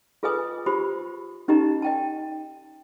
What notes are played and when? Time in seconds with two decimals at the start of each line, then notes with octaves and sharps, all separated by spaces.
0.23 F4 G#4 B4 D#5 G#5 D#6
0.66 F4 G4 C5 B5
1.48 C#4 D#4 G4 D#5 A#5
1.82 D#5 G5 A5